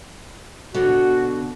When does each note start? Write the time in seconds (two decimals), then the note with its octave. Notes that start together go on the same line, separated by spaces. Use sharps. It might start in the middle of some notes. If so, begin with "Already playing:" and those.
0.74 B2 D3 F#4